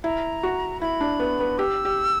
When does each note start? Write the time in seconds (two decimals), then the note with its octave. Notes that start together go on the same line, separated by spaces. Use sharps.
0.04 E4 A#5
0.43 F#4
0.81 E4 B5
1.01 D4
1.20 B3
1.40 B3
1.58 G4 E6
1.85 G4